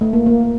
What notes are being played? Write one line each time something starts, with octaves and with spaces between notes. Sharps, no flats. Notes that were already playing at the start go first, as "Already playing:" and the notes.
A3
A#3
A#3